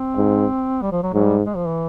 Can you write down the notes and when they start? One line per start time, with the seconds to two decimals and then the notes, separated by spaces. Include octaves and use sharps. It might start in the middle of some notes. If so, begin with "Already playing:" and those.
Already playing: C4
0.17 G#2
0.82 G3
0.92 F3
1.03 F#3
1.14 G#2 F#3
1.25 G3
1.46 G#3
1.56 F3
1.68 E3